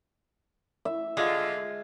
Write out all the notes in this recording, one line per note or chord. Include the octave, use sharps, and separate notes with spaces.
E5
D3 G#3 F4